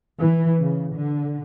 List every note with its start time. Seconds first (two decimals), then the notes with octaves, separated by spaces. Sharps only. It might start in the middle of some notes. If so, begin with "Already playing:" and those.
0.19 E3
0.60 C#3
0.94 D3